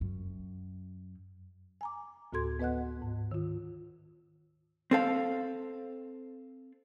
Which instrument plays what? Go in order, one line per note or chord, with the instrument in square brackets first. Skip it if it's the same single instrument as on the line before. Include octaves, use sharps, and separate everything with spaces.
[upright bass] F#2
[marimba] G#5 A#5 D6
D2 A2 F#4 A4 C6 G#6
B3 B4 D#5 F#5 F#6
G#2
D#3 F4
[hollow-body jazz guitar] C4 A4 F5